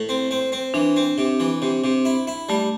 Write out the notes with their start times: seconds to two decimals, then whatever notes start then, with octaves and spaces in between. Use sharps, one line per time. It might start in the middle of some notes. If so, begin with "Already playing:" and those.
Already playing: A2
0.09 C4
0.31 C4
0.52 C4
0.74 E3 D4
0.96 C4
1.18 C3
1.40 E3
1.62 C3
1.84 C3
2.05 E4
2.27 E4
2.49 G3 A3